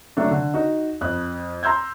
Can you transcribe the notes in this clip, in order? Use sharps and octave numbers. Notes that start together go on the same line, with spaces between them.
F#3 A3 D4
D3
D#4 F#4
F2 F#6
A#5 C6 E6 G6 G#6